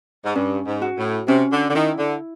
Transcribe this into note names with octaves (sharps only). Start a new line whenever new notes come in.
G#2
G2 C#4
G#2
F#4
A2
C3 C#4
D3
D3
D#3 E4
D3